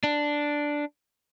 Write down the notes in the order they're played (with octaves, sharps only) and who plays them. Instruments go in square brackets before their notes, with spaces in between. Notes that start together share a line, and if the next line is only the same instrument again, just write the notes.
[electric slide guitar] D4